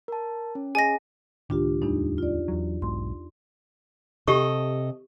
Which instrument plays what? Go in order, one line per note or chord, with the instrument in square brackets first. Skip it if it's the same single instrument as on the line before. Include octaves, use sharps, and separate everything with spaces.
[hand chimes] A#4 A5
C#4
[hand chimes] G#4 D#5 [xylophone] G#5 A#6
[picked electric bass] C#2 A2 D#3 [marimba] D4 F4 G4
[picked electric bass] D1 A2 G3 [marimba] E2 D4 D#4
[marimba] F4 D5
[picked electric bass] E2 F#3
[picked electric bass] B1 G#2 B2 [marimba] C6
[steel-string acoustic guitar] C3 A4 D#5 [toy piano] G4 C#6